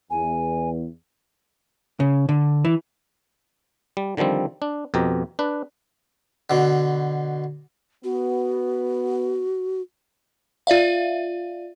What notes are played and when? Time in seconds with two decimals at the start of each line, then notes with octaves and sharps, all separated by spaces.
0.10 E2 G#5
2.00 C#3
2.29 D3
2.65 E3
3.97 G3
4.17 D3 D#3 F3 G3 C4
4.62 D4
4.94 F2 B2 G4 A#5
5.39 D4 B4
6.50 B2 D3
8.04 B3 F#4
10.67 F4 D5 E5 F5